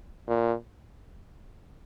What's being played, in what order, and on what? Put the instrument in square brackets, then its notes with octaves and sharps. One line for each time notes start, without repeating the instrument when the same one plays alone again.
[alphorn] A#2